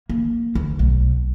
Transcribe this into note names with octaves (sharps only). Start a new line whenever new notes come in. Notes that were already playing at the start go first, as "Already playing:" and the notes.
A#3
D2
B1